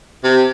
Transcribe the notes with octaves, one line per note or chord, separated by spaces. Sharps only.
C3